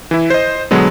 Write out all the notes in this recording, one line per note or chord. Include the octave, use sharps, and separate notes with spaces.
E3 E4
C5 D#5
B2 D3 F#3 G#3 B3